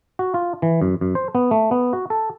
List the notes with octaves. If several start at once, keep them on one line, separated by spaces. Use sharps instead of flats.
F#4
F4
E3
F#2
F#2
C5
B3
A3
B3
F#4
A4